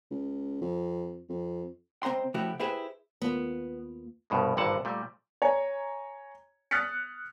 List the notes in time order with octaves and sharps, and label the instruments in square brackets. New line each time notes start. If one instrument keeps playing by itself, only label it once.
[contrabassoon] C#2
F2
F2
[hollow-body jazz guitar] C#2 C4 C5 A#5 C6
C#3 F3 A3 E4 F#4 G4
E4 G4 G#4 B4 C5
[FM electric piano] D#2 A#3 F4 [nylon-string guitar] B3
[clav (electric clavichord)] C2 G2 B2 G#3
G#1 G2 A#2 D3 F#5 A5
A#2 G3 A3
[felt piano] C#5 G#5 A#5
D#6 F6 F#6 A6 B6 C#7